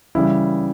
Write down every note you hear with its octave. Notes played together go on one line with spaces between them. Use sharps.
C#3 E3 G3 E4